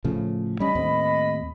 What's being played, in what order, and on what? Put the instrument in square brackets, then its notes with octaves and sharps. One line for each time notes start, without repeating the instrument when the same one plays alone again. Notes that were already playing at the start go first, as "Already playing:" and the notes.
[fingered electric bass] A2 C#3 F3
[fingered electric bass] G3 C#4 [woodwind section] D#5 B5
[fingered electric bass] D#2 A2 C4